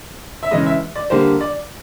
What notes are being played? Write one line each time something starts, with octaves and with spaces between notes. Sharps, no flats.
E5
C#3 E3 G#3 D#5
E5
D5
D3 G3 A#3 C5
D5